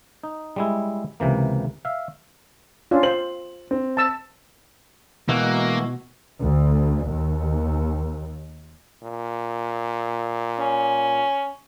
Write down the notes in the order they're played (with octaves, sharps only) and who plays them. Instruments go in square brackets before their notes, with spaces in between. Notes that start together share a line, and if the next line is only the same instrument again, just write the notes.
[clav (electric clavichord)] D#4
G3 G#3 E4
C#2 C3 E3 A#3
E5 F5
[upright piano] C#4 D4 [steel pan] F4
[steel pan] C5 [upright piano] F#7
[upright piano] C4
[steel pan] A5 E6
[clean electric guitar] B2 [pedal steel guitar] E3 G#3 F#4 [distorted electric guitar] A#3
[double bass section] D2
D#2
[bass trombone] A#2
[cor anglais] C#4